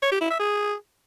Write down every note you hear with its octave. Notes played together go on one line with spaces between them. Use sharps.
C#5
G4
E4
E5
G#4